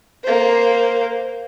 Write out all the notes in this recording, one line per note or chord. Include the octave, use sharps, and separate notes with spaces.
A#3 C5